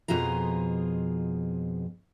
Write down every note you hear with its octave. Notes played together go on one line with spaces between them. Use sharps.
F2 B2 F4 G#4 A#5